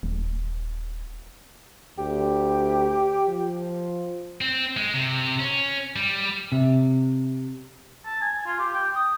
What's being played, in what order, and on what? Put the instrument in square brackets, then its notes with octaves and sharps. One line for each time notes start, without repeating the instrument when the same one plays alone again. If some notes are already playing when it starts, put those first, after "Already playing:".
[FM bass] D#1
[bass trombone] D2 [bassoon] G4
[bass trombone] F3
[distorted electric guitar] C4
G#3
C3
C#4
G3
[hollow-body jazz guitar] C3
[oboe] A5
G#5
F4
G4
G5
D#6